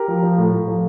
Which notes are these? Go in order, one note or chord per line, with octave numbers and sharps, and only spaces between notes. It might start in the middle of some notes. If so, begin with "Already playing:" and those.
Already playing: G4 A#4
F3
F3
A2
A2
F3